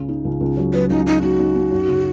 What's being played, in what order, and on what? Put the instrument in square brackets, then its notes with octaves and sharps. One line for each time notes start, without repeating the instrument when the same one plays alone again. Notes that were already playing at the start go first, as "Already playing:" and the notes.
Already playing: [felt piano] C#2 C#3
D#4
C#2
C#2
F#3
[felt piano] F#3 [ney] B4
[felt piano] C#2 [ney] D#4
[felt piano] F#3 [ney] D#4
[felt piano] D#4 [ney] F#4
[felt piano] D#4
D#4
F#2
C#3